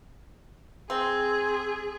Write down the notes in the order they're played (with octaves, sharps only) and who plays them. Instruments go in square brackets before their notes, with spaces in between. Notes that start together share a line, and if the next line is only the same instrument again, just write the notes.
[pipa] C4 [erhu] G#4